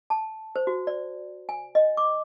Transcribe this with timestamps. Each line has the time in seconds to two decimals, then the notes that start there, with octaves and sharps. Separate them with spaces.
0.10 A5
0.56 C5
0.67 F#4
0.87 D5
1.49 G#5
1.75 D#5
1.97 D6